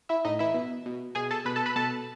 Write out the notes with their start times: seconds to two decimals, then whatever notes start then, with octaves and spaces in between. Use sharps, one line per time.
0.09 E4 E5
0.25 A2 D#4 D#5
0.39 E3 E4 E5
0.54 B2
0.86 B2
1.15 B2 G#4 G#5
1.31 A4 A5
1.45 B2 B4 B5
1.56 A4 A5
1.66 B4 B5
1.76 B2 A4 A5